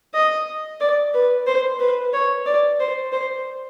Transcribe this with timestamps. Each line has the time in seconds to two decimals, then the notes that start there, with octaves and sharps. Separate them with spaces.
0.14 D#5
0.80 D5
1.14 B4
1.47 C5
1.80 B4
2.13 C#5
2.46 D5
2.80 C5
3.12 C5